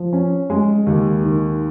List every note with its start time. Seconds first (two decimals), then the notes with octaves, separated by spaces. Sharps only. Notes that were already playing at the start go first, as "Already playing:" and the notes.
Already playing: F3
0.13 C#4
0.50 G#3
0.87 D#2
1.24 D#3